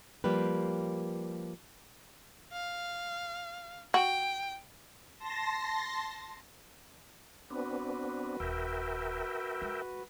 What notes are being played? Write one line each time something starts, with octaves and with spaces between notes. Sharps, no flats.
F3 G3 A#3 G4 B4
F5
F#4 G5
A5 C6 A#6
B3 C4 D4 F#4 B4
D#1 A#4 E5 G5
G#3